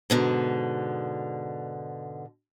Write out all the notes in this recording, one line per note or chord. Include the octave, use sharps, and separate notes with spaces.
G#2 B2 D3